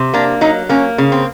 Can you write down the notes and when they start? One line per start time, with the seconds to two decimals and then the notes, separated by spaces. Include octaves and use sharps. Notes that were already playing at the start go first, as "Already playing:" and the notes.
Already playing: C3
0.14 A#3 D4
0.41 F#3 D#4
0.69 A#3 C#4
0.98 C#3
1.12 C4